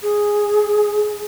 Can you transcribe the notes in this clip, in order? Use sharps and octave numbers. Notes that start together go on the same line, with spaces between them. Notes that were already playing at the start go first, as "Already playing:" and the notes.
G#4